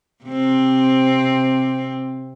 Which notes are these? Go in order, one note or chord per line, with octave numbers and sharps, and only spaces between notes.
C3 C4